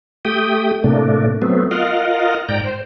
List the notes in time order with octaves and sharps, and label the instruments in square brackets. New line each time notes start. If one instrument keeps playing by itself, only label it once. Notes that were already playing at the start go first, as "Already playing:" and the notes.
[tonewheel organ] A3 G4 G5 D#6
A2 C3 A3 A#3 D4
F#3 A3 B3 C4
F4 A#4 D#5 F5 F#5
G#2 D5 G5 A#5
C5